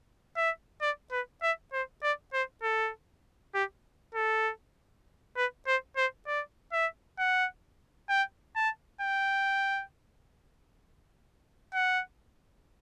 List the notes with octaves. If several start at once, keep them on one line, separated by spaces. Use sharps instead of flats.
E5
D5
B4
E5
C5
D5
C5
A4
G4
A4
B4
C5
C5
D5
E5
F#5
G5
A5
G5
F#5